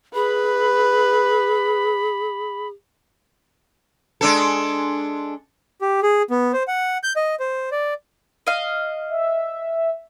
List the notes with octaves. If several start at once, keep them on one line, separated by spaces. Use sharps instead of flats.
G#4 B4 B5
G#3 D4 A4
G4
G#4
B3
C5
F#5
G6
D#5
C5
D5
D#5 F5
E5